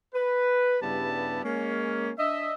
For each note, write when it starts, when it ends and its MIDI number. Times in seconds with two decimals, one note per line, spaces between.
0.15 0.78 71
0.83 1.43 43
0.83 1.43 49
0.83 1.43 55
0.83 1.43 59
0.83 1.43 64
0.83 1.43 81
1.44 2.11 56
1.44 2.11 58
1.44 2.11 61
2.19 2.54 62
2.19 2.54 75
2.19 2.54 76